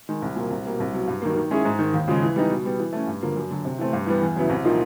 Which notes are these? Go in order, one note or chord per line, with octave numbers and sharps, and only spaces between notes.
D#3 G#3
C2
A#2 F#3 A#3
C2
B2 G3 A#3
C2
B2 F#3
G2
D#3 F#3 A#3
D#3
G#3 C#4 E4 G#4
G#2
D#3 G#3
D#2
C#3 F3 G#3
E3
G3 B3 D#4
B2
G3 B3
E3
A3 C#4
G2
D3 F3 A#3
F#2
D3 F#3
C3
E3 A3 C4
G2
E3 G3 B3
E2
C#3 F#3 B3 E4
C2
A#2 F3 A#3 D#4